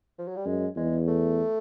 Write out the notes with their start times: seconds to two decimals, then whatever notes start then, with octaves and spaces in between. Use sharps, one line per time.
0.18 F3
0.28 F#3
0.36 G3
0.45 F#2 G#3
0.76 E2 G#3
1.07 A3